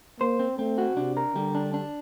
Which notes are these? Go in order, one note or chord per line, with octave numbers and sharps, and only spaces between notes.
A#3 C5
C4
A3 C4
F#4
C3 D4
A#4
D3 G3
D4
D4